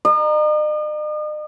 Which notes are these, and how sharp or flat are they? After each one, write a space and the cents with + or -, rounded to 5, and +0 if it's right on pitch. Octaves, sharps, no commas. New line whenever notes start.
D#5 -45 A#5 +0